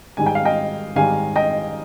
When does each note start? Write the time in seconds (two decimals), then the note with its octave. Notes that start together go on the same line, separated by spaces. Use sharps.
0.17 G#2 D#3 G3 G#5
0.26 G5
0.35 F5
0.45 D#5 G5
0.96 G#2 D#3 G3 F5 G#5
1.36 D#5 G5